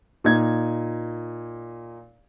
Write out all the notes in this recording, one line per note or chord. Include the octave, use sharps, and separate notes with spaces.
A#2 D#4 G#6